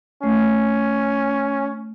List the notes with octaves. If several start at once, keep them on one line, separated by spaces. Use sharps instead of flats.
A3 C#4